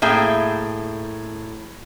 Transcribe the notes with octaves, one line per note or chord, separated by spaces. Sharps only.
A2 A#3 G#4 E5 G5